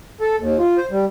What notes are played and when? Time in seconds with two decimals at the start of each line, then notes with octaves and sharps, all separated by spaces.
0.21 A4
0.39 D#2
0.59 F4
0.78 C5
0.91 G3